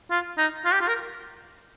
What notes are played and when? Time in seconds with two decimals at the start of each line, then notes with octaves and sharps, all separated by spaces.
0.11 F4
0.38 D#4
0.65 F4
0.73 G4
0.81 F4
0.88 A#4